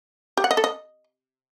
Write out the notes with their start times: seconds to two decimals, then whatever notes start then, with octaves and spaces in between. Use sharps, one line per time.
0.37 G4
0.44 F#5
0.51 D#5
0.57 A4
0.64 D#5